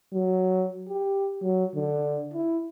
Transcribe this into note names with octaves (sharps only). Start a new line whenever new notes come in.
F#3
G4
F#3
D3
E4